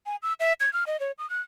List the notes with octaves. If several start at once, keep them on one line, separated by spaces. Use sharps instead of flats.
G#5
E6
E5
G#6
F6
D#5
C#5
D#6
F#6